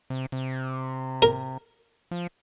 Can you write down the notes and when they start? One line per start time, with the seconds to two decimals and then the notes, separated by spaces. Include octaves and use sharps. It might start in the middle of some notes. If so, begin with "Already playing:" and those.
0.10 C3
0.32 C3
1.22 A#4
2.11 F3